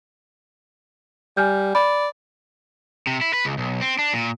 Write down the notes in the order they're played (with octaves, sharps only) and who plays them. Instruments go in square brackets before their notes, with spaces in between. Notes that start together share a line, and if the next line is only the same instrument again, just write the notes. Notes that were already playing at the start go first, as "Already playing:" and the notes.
[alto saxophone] G3 [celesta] G#5 F6 G6
[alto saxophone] D5 [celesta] B5
[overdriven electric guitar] C3
E4
B4
C#2
B1
C4
D4
A#2